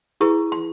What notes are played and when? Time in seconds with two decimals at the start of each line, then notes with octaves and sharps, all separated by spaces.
0.21 E4 G#4 B4 C#6
0.52 C6